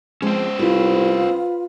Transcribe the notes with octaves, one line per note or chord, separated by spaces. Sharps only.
F3 G#3 C4 C#4 C5
C2 F4 B4